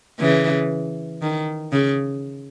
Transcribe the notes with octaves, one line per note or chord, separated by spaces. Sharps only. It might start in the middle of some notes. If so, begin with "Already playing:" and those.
C#3 E3
D#3
C#3